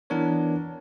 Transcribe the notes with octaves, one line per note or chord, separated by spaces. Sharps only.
E3 B3 D4 A#4 C#5